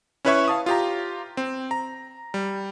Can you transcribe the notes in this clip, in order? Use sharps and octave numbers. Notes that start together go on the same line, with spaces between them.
C#4 E4 B4 C#5 E5 C#6
F5 A5 D#6
F4 G4 A#5
C4
A#5
G3